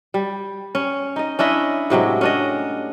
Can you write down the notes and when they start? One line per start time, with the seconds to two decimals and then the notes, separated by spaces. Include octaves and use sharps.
0.14 G3
0.75 C#4
1.16 D#4 D#5
1.39 C#4 D4 E4 D#5
1.90 A2 C3 F#3 G#3
2.21 C#4 D4 D#5